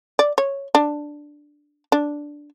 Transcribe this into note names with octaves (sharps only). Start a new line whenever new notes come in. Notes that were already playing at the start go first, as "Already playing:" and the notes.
D5
C#5
D4
D4